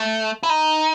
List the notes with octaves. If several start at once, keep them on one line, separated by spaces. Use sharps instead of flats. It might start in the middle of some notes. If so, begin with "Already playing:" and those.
Already playing: A3
E4
D#4